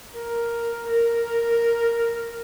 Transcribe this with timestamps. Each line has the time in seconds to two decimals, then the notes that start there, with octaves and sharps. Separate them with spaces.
0.13 A#4
0.87 A#4